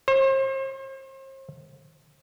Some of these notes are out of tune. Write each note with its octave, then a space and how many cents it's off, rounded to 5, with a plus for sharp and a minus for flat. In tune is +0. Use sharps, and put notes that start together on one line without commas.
C5 +40